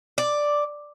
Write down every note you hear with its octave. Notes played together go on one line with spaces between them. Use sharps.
D5